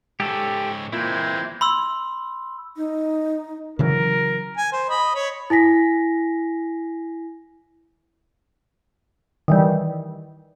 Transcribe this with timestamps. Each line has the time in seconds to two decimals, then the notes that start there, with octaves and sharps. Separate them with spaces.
0.20 G#2 C#4 G4 A4
0.93 A#2 E3 G#3 C4 E4 C5
1.61 B5 C6 E6
2.77 D#4
3.79 C#3 E3 F#3 A#4
4.57 G#5
4.73 C5
4.90 D#5 B5
5.15 C#5 B5
5.50 E4 G#5 A#6 B6
9.48 D#3 E3 G3